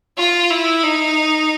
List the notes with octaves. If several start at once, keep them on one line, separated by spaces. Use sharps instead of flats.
F4
E4
D#4